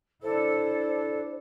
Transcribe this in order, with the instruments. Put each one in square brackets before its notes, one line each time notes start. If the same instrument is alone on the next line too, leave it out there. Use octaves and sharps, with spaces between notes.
[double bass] D4 E4 [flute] A4 [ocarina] C5